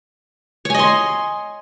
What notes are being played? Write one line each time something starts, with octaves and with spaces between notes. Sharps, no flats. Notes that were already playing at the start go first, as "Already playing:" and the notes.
C#5 D#5 G#5 C6